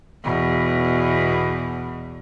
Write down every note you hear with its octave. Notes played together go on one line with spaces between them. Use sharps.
E2 B2